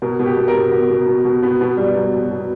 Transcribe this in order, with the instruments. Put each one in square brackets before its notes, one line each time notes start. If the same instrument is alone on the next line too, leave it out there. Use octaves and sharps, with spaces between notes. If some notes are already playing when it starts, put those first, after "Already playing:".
[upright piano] B2 A#4
B2
G4
B2
A#4
B2
B2
B2
B2
B2
B2 B3
B2 B3
B2 G3
B2 F#3
B2
B2